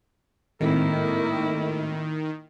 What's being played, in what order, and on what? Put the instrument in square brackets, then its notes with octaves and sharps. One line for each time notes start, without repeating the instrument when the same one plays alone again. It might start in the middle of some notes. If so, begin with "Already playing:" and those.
[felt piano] G#1 A2 C4 [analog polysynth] D#3 [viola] A#3 E4